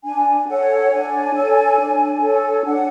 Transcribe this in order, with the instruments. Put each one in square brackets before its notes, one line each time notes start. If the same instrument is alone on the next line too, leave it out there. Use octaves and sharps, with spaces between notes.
[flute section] D4 G#5
A4 C#5 F#5
D4 G#5
A4 C#5
D4
A4 C#5
D4 F#5